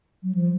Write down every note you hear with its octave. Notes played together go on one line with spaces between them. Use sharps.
F#3
F3